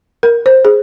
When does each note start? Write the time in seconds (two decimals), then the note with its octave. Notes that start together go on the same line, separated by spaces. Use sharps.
0.23 A#4
0.46 C5
0.65 G#4